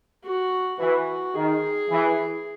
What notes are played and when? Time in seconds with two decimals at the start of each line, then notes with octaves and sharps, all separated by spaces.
0.24 F#4
0.79 E3 F#4
1.35 D#3 G#4
1.90 E3